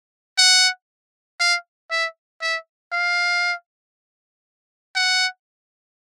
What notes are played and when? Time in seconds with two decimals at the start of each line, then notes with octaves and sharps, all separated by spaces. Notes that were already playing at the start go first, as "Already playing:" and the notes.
0.38 F#5
1.40 F5
1.91 E5
2.41 E5
2.93 F5
4.96 F#5